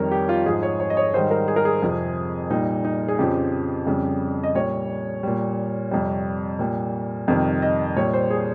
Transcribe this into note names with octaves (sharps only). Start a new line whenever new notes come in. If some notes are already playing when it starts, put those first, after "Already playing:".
Already playing: F2 D#3 G3 A#4 C#5
G4
F4
G#2 F3 G#4
C#5
C#5
D#5
C#5
G#2 D#3 G3 C5
A#4
G#4
A#4
G#4
F2 C3 F3
A#2 G3 D#4
D#4
G#4
F2 C#3 F3 G4
F2 C#3 G3
D#5
A#2 G3 C#5
A#2 G3
F2 C3 G3
A#2 G3
F2 C3 D#3 G3
D#5
A#2 G3 C#5
C5
G#4